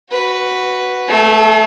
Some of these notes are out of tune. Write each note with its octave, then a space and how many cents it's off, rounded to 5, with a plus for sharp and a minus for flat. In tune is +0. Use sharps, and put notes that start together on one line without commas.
F#4 +0 B4 +0
A3 +0 A4 -45